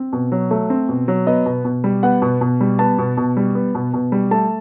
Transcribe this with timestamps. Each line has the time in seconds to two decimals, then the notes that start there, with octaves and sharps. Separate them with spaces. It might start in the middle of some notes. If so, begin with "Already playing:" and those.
Already playing: C4
0.13 B2
0.32 F#3
0.51 A3
0.70 C4
0.89 B2
1.08 F#3
1.27 B3 D#5
1.46 B2
1.65 B2
1.84 G3
2.03 B3 F#5
2.22 B2
2.41 B2
2.61 G3
2.79 B3 A5
2.98 B2
3.17 B2
3.37 G3
3.55 B3
3.75 B2
3.94 B2
4.12 G3
4.31 A3 A5